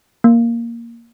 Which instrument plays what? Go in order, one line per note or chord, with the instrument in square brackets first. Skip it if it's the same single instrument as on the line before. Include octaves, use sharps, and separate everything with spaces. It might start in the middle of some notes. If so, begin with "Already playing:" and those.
[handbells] A#3